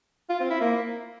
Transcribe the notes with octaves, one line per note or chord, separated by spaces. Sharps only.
F4
C4
E4
A#3